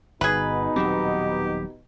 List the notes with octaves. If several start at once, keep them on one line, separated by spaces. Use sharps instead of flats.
G1 B2 B3 D#4 G#4 B4
D#1 F#3 C4 G4